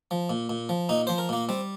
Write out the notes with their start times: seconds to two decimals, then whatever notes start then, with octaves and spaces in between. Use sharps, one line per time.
0.11 F3
0.30 A#2
0.50 A#2
0.69 F3
0.89 A#2 D#4
1.07 F3 C5
1.18 A#4
1.29 A#2 A#3
1.49 G3 C4